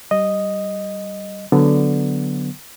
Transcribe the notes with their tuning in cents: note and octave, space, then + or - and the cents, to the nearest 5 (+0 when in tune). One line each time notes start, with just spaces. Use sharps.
G3 -20 D#5 -5
D3 -5 F#3 +0 B3 +0